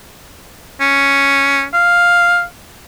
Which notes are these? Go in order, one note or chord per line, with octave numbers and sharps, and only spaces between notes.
C#4
F5